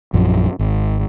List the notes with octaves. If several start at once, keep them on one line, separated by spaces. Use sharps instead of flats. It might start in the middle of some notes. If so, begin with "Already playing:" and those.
A#1 F#2 F3
G#1